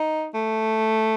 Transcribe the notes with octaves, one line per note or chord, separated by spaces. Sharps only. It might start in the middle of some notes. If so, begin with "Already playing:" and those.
Already playing: D#4
A3